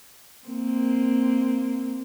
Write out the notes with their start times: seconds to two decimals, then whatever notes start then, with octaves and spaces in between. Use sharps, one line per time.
0.48 A#3 C4